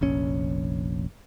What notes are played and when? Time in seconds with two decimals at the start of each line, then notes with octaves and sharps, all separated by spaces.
0.01 F1 A#1 C#4